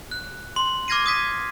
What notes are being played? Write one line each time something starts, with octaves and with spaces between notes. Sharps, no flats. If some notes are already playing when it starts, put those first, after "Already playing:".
F#6
C6
D6 F6 G#6 A#6 C7 D#7
D#6 G#6 B6 D#7